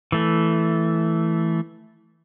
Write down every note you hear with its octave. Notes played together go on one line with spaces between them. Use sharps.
E3 A3